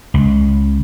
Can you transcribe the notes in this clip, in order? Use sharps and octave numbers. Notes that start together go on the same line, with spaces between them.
C#2